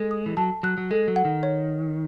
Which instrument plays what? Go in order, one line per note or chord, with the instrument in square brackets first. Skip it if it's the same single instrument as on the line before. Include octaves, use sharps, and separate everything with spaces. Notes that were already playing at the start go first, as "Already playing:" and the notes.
Already playing: [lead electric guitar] G#3 [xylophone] A4
[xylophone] D#6
[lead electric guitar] E3
[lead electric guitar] F#3 [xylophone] A5
[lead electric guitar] F#3 [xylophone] F#6
[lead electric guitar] F#3
[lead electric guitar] G#3 [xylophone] A4
[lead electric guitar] F#3
[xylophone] F#5
[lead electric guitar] D#3
[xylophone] C#5